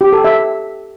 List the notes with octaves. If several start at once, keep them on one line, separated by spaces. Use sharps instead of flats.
G4
A4
E5